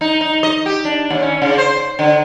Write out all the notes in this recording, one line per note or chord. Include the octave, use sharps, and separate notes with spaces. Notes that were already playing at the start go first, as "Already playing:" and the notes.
D#4
D#4
D#5
G4
D4
D#2
C#4
C#3
C5
D3